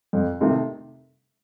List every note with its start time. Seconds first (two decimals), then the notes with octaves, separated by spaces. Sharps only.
0.13 F2
0.41 C3 D#3 A3